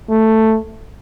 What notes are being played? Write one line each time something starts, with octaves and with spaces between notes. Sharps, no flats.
A3